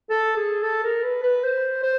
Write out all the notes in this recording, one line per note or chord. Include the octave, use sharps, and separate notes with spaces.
A4
G#4
A4
A#4
B4
B4
C5
C5